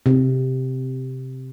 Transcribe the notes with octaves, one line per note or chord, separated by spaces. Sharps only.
C3